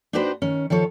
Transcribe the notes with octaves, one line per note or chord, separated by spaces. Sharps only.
D4 D#4 F#4 G4 B4 C5
D#3 C#4
D#3 F3 A4 C#5